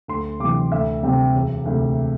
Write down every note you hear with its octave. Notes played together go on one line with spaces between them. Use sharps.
D2 C6
C3 E3 D6
D2 E5
C3 G3 C4
E1
D2 C3